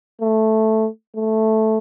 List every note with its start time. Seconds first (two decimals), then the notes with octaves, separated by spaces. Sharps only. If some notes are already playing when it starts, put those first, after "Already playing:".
0.22 A3
1.16 A3